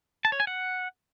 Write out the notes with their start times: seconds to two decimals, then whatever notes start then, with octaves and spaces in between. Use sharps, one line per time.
0.25 A5
0.32 C#5
0.40 G#5
0.47 F#5